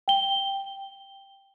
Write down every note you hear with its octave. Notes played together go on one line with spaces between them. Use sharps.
G5 G7